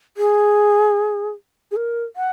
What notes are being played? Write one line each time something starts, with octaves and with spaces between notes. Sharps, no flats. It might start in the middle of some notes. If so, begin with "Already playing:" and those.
G#4
G#4
A#4
F#5